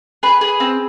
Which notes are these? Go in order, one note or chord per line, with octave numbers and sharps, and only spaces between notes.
G#4 B4
G#4
C4